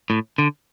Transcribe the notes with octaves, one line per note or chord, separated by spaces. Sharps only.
A2
D3